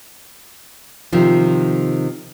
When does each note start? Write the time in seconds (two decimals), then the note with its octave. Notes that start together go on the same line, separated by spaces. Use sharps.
1.12 C3 D#3 F3